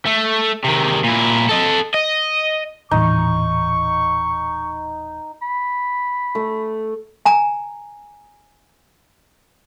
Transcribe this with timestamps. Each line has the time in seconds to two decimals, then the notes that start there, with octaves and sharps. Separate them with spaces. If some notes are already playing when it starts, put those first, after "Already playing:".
0.07 A3
0.64 C3 D#3
1.04 A#2 E4
1.49 A4 D#5
1.94 D#5
2.91 D#1 A2 E3 D#4 C#6
5.42 B5
6.35 A3
7.26 G#5 A#5